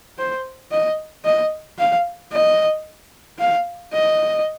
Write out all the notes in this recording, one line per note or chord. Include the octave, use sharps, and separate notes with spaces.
C5
D#5
D#5
F5
D#5
F5
D#5